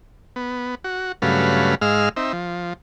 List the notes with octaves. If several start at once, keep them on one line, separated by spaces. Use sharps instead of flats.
B3
F#4
G2 C#3 F#3 A3 B4 F5
G#2 G#3 D#5 F5 E6 F6
C4 D#4 E5
F3